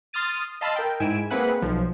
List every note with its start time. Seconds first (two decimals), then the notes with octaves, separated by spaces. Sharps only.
0.13 C6 D#6 F6 A6 D#7
0.61 D#5 F5 A5 B5 C6 E6
0.76 A#4 G5
1.00 G#2 E4 G#5 D7 E7
1.30 A#3 C4 G#4 B4 E5 F#5
1.62 B1 F3